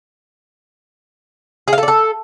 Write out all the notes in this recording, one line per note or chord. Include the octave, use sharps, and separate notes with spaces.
G#4
F5
A4
D5
A4